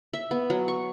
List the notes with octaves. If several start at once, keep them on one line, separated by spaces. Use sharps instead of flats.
E5
B3
F#3
C#6